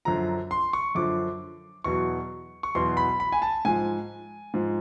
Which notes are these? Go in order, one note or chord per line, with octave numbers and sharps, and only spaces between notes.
F#2 D3 F3 A#5
C6
C#6
F#2 D3 F3 D6
E2 B2 F#3 C#6
C#6
E2 B2 F#3 C6
B5
B5
G#5
A5
G#2 F3 G#5
G#2 F3